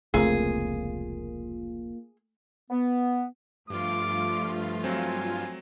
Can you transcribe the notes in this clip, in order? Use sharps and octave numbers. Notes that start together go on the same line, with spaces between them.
F1 C#2 A3 A#3 C4 F4 G#4
B3
G2 F3 A3 F4 D6
F#3 C4 G#5